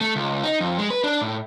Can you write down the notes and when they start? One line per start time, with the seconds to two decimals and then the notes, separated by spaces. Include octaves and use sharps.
0.01 A3
0.16 C#2
0.44 D#4
0.61 F2
0.78 G#3
0.90 B4
1.04 D4
1.21 A2